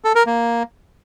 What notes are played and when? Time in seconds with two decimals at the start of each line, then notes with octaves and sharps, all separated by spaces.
0.04 A4
0.15 A#4
0.26 A#3